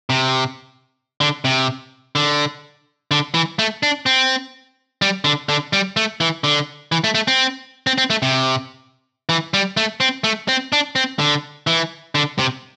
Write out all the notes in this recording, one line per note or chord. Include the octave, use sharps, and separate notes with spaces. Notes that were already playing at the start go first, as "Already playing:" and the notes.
C3
D3
C3
D3
D3
E3
A3
D4
C4
G3
D3
D3
G3
A3
E3
D3
E3
A3
A3
C4
C4
C4
A3
C3
E3
G3
A3
C4
A3
C4
D4
C4
D3
E3
D3
C3